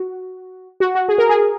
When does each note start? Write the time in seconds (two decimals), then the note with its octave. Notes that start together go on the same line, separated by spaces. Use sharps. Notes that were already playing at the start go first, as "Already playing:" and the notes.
Already playing: F#4
0.80 F#4
0.95 F#4
1.09 G#4
1.18 A#4
1.29 G#4